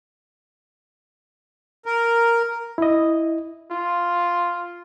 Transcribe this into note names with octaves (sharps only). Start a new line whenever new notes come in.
A#4
E4 D#5
F4